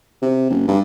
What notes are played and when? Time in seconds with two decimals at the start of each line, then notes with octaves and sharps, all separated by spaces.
0.22 C3
0.50 F#1
0.67 G2